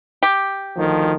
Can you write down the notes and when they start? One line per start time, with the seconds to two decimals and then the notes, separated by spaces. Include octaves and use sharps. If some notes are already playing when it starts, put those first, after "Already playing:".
0.23 G4
0.77 D2 D#3 F3